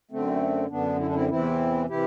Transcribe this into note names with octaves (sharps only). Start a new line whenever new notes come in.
F#2 D3 A3 C4
F#2 D3 B3 D4
E4
D4
C4 E4
E2 C3 E3 C4 E4
C3 E3 E4 G4